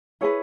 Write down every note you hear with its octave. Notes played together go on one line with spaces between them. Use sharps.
E4 G#4 B4 C#5